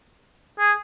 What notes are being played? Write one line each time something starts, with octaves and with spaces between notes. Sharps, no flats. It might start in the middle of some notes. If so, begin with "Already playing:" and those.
G#4